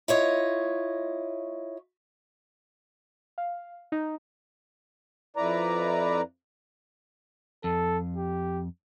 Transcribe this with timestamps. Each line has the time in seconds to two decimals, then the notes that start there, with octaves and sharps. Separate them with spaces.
0.08 E4 F4 C#5 D#5
3.38 F5
3.92 D#4
5.37 F2 E4 B4 D5 A#5
7.64 F2 A4
8.17 G4